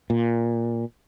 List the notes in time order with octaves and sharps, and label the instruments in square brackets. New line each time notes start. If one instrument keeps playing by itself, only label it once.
[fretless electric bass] A#2